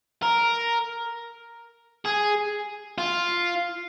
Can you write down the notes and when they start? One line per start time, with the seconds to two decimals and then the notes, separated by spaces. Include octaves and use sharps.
0.23 A#4
2.06 G#4
2.98 F4